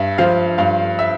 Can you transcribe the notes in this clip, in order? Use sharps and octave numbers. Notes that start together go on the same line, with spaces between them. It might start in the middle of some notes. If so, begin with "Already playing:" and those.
Already playing: G2 E5
F3 F5
G2 F5
E5